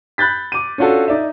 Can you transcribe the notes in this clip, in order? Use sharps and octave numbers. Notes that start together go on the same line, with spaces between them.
B5 F#6 G6 A6 B6
D6 D#7
C#4 D4 F4 F#4 A4
D#4 D5 E5